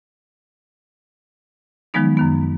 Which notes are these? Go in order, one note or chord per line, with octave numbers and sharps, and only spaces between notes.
D#3 F3 F#3 G#3 B3 D#4
F#2 D#3 B3